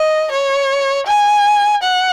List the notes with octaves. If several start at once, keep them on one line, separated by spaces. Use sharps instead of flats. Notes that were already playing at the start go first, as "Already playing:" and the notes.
Already playing: D#5
C#5
G#5
F#5